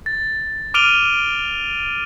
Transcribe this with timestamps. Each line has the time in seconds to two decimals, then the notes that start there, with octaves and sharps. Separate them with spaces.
0.06 A6
0.74 D6 F6 D7 D#7 F7 G7